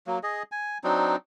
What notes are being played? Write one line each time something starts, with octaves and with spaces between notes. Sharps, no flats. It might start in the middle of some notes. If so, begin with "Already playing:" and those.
F#3 A#3
G#4 D#5
G#5
F#3 C4 D4 D#4